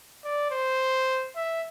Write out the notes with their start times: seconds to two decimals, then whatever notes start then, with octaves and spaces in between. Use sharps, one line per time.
0.24 D5
0.51 C5
1.36 E5